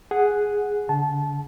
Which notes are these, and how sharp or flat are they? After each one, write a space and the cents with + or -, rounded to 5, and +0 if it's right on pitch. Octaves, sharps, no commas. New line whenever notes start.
G#4 +0 F#5 +0
D3 -35 A5 -20